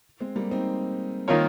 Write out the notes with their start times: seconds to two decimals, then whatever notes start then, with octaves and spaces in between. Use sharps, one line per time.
0.20 G#3 C4
0.36 G3 A#3
0.51 C4 D#4
1.28 D#3 A#3 F4 A#4 C#5